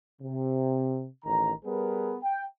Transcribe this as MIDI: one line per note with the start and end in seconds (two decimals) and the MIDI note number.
0.22 1.07 48
1.25 1.52 33
1.25 1.52 51
1.25 1.52 82
1.65 2.17 55
1.65 2.17 59
1.65 2.17 68
1.65 2.17 70
1.65 2.17 71
2.23 2.45 79